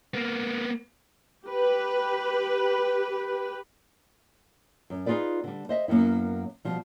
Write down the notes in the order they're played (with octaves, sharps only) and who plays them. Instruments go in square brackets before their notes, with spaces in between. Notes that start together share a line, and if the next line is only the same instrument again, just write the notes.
[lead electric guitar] A#3 B3
[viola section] G4 B4
[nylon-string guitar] F#2
D#4 F4 G#4 B4 D5
D3 G3
C5 D#5 E5
F#2 A#3 B3 E4
B2 F3 G3